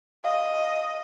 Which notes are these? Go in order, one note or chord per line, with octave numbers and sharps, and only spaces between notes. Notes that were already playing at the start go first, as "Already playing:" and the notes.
D#5 F5